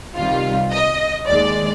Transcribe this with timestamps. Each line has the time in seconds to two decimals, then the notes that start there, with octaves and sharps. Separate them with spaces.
0.15 C2 C3 D#3 G3 F4
0.72 D#5
1.27 D#2 D#3 G#3 D5